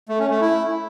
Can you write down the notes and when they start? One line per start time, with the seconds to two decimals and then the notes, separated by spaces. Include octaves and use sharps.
0.09 A3
0.20 C#4
0.30 A3
0.41 E4